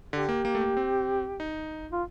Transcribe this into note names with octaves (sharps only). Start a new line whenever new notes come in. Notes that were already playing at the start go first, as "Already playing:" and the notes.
D3 G4
A#3
A#3
A3
A#3
C4
D#4
F4